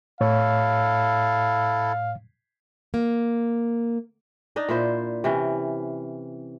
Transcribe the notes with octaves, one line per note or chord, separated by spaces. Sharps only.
A2 E4 A4 C#5 F5
A#3
D4 D#4 D#5
A#2 E4 C5
C3 E3 C#4